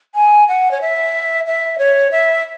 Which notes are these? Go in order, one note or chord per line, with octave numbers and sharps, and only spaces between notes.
G#5
F#5
C#5
E5
E5
C#5
E5